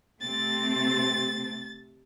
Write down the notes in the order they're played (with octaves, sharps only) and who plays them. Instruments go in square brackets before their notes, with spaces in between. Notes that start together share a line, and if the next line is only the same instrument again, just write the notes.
[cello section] C3 A3 C4 [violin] A6